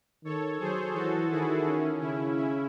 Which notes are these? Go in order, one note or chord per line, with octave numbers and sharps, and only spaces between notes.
D#3 A4 C#5
F#3 G#4 C5
E3 F#4 A4
D#3 E4 G#4
C#4
C#3 C#4 E4
C#4 E4